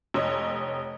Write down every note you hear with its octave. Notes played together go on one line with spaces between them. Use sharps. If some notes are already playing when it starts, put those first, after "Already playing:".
F1 C#5 D#5